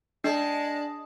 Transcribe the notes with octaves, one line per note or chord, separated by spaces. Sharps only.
G#3 D4 D5 A5